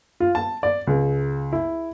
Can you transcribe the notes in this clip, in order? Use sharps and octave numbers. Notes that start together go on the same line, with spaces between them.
F4
A5
D5
C#2
E4